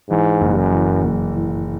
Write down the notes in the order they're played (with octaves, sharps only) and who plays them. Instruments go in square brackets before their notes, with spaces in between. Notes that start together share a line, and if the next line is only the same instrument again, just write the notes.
[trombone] G#2 [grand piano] E3
[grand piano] F#1
[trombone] F#2
[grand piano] E3
F#1
E3